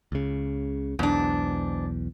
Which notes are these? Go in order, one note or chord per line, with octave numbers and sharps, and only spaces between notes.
C#2 C#3
B1 E2 G#2 D4